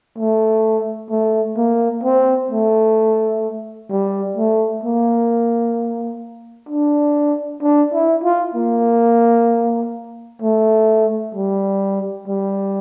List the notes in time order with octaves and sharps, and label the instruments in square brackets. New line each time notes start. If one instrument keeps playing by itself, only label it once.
[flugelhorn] A3
A3
A#3
C4
A3
G3
A3
A#3
D4
D4
E4
F4
A#3
A3
G3
G3